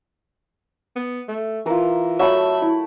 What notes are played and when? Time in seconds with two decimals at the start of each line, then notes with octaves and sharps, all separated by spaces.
0.96 B3
1.28 A3
1.66 E3 F4 A#4
2.19 F#3 A3 E5 B5
2.62 E4